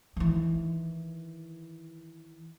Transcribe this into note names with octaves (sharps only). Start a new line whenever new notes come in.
D#3 E3